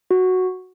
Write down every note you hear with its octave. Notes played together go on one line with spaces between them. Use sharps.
F#4